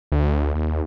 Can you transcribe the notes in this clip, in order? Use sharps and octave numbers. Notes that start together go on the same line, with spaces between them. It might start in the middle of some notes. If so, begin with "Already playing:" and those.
D2
D#2